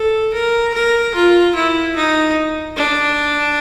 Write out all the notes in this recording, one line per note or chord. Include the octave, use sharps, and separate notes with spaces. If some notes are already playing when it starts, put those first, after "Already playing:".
Already playing: A4
A#4
A#4
F4
E4
D#4
D4